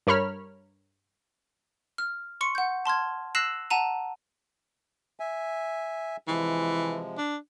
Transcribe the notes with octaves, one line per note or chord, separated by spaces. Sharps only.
G2 A#4 C#5 B5 F6
F6
C6 C#6 C#7
F#5 G6
A5 C6 F6 G#6
E6 F#6 A#6 C7 E7 F#7
F#5 A5 A#5 D#7
E5 G#5
C3 E3 F3 G#3
D4